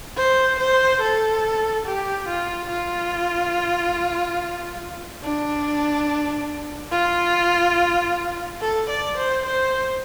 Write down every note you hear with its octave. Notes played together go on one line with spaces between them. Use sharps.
C5
C5
A4
G4
F4
F4
D4
F4
A4
D5
C5
C5